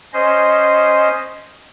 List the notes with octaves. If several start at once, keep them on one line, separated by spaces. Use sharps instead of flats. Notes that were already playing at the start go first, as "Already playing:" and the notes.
C#4 C5 D#5